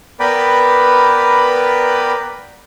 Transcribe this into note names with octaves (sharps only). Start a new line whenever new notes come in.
B3 A#4 B4 D5 G5 B5